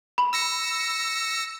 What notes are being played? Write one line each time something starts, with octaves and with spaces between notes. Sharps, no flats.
B5
E6 A#6 C#7